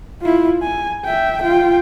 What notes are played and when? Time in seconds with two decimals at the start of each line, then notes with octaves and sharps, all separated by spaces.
0.21 E4 F4
0.62 G#5
1.05 E5 G5
1.42 F4 G5